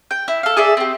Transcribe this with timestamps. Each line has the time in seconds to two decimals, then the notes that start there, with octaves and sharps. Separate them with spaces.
0.11 G5
0.28 E4
0.43 A4 F5
0.57 G#4 A4 D5 E5
0.77 C4 G4